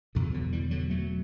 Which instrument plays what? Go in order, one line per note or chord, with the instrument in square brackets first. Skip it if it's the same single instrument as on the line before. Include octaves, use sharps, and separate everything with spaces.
[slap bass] E2 B2 D3
D3 F#3
E3 G3
D3 F#3
F#3 A3